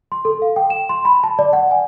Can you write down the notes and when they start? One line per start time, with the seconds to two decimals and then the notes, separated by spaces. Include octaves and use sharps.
0.12 C6
0.25 A4
0.42 F5
0.56 G5
0.70 E7
0.89 C6
1.05 B5
1.24 A5
1.39 D5
1.53 F#5
1.71 G#5